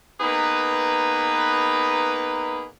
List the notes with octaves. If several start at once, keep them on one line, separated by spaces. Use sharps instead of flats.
A#3 B3 D#4 G#4 B4